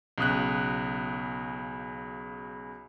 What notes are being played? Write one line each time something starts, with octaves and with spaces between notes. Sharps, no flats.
B1 C#3 D#6 F#6